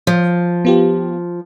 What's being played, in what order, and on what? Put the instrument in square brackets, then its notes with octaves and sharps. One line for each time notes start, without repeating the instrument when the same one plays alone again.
[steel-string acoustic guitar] F3
[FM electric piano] B3 F4 G4